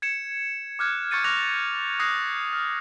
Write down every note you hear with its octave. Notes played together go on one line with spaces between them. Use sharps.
G#6 C#7 E7
D6 F6 F#6 G#6
C#6 G6 A6 C#7 D#7
C#6 D6 F6 F#6 A#6 F7
D#6 F#6 G#6 A#6 C7
F6